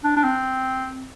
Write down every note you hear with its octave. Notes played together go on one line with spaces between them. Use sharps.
D4
D4
C4